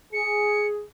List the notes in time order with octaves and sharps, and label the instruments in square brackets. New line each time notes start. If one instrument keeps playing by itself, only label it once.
[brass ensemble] G#4 [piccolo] C#7